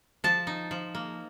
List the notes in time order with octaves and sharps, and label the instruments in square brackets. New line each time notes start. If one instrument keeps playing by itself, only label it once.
[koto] F3 A5
D#4
F3
A#3